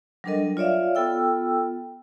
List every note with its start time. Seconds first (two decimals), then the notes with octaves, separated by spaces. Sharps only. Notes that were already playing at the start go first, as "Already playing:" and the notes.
0.24 F#3 G3 D4 A4 A#4 D#5
0.57 F4 C#5 D5 E5 F5
0.95 B3 F4 A4 G5 E6